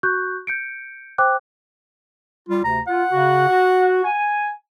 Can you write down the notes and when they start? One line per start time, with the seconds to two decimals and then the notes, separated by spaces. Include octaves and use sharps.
0.03 F#4 C#6 F#6 G6
0.47 G6 C#7 D7
1.18 C5 G5 D6 F#6
2.49 G3 F4
2.64 D2 C3 A#5
2.87 F4 F#5
3.11 C#3 F#4
3.48 F#4
4.04 G#5